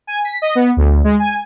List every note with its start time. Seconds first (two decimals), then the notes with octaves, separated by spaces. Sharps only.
0.07 G#5
0.25 B6
0.42 D#5
0.55 B3
0.77 D2
1.04 G#3
1.19 G#5